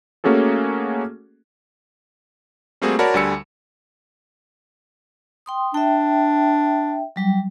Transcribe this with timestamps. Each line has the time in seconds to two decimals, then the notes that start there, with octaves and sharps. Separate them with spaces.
0.24 A3 A#3 C#4 F#4 G#4 A4
2.82 G3 A3 A#3 C4 F#4 G#4
2.99 F#4 A#4 C#5 D5 A5 B5
3.14 D2 D3 G3 G#5 E6 C#7
5.46 G5 C6 D#6
5.74 D4 E5 G5
7.16 F#3 G3 G5